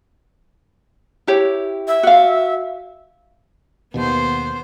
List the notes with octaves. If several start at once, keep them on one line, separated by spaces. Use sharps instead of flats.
E4 G4 C#5
E5
F#4 F5
D#2 B2 B3 C5